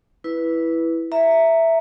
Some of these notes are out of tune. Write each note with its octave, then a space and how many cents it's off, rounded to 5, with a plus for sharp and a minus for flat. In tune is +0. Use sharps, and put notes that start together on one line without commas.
E4 +0 B4 -10
E5 +0 A#5 -10